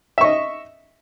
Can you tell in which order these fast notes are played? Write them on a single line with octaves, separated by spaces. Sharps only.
E5 C#6 D#5